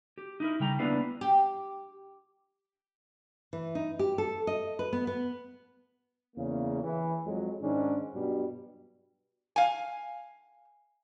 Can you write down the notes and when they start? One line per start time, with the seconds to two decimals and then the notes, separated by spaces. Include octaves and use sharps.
0.18 G4
0.40 D#4 E4 A#4
0.60 C#3 G3 G5 A#5
0.79 A#3 B3 D4 E4 B4 F5
1.21 G4
3.53 E3
3.75 D#4
3.99 G4
4.18 A4
4.47 D#5
4.79 B4
4.93 B3
5.07 B3
6.36 E2 C#3 A#3
6.83 E3
7.26 F2 F#3 G#3
7.62 G#2 D#3 C#4 D4
8.14 G2 B2 F#3 G3
9.56 F5 G#5